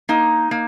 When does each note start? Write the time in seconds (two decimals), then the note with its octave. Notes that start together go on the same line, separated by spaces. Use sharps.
0.09 A#3 D#4
0.51 A#3